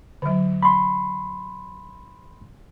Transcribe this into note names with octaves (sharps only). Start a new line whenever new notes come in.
D3 F#3
B5 C6